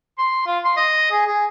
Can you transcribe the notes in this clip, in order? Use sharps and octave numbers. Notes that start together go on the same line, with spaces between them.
C6
F4
C6
D#5
G#4
G#4